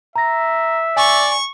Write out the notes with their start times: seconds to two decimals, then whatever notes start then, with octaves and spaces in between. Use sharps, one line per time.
0.16 E5 A#5 A#6
0.97 D5 G#5 C#6